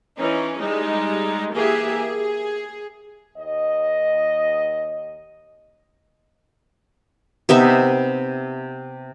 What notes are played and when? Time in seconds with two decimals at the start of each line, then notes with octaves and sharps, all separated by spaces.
0.19 E3 C#4 D#4
0.59 G3 G#3 D#4
1.55 E3 A#3 G4 G#4 E5 G#5
1.95 G#4
3.37 D#2 D#5
7.49 C3 B3 D#4 E5